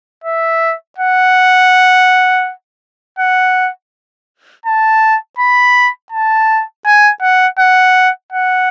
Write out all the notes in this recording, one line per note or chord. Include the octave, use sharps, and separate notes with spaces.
E5
F#5
F#5
A5
B5
A5
G#5
F#5
F#5
F#5